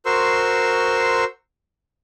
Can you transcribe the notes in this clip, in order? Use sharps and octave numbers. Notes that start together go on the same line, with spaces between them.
F#4 A#4 C5 C6 C#6 E6